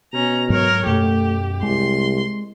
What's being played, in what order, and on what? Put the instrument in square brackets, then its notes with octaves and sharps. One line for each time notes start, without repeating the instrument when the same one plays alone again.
[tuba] B2 [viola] C#4 A#5
[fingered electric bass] G#2 F#3 [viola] A#4 C#5
[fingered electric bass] F#2 B2 [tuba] A3 [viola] G4
[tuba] C2 [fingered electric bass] G#3 [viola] C6